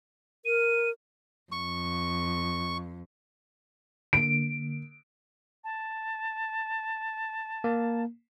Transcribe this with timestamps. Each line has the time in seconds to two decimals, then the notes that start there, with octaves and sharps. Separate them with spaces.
0.45 A#4 D#7
1.52 F2 C#6
4.13 D3 A#3 D7
5.64 A5
7.64 A#3